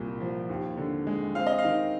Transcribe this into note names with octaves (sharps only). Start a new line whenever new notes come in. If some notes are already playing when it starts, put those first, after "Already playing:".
Already playing: C2 A#2
F3
D#2
D3
G#3
C4 F5
D#5
F5
D#3